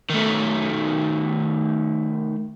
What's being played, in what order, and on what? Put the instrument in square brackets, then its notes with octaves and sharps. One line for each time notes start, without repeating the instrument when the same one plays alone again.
[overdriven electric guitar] D#3 A3